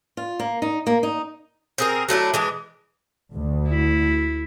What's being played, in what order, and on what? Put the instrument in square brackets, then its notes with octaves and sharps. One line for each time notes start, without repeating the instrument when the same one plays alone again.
[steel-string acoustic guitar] F4
A#3
D#4
A#3
D#4
[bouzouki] C4 G#4 A#4
F#3 A3 D4 E4
E3 G#3 D4
[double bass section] D2
[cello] E4